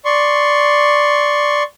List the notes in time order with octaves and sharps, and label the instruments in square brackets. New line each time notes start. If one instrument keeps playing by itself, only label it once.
[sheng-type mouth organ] D5 C6 C#6